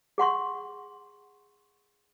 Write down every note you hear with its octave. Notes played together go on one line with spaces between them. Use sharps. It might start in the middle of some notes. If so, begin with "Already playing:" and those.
G#4 F#5 C6 C#6